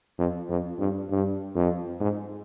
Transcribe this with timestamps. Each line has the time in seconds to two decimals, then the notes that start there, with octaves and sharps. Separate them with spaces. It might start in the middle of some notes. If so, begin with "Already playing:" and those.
0.18 F2
0.49 F2
0.79 G2
1.09 G2
1.55 F2
2.00 G#2